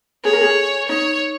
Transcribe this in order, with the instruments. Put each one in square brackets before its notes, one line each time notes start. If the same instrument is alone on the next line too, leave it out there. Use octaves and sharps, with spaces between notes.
[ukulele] G#4 [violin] C#5
[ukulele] A#4
G#4
[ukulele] D#4 [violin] C#5